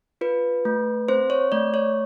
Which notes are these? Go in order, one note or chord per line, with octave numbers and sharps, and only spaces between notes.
F4 B4
A3
C4 C5
C#5
A3 D5
C#5